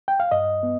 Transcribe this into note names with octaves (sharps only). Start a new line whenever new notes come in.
G5
F5
G2 D#5
B3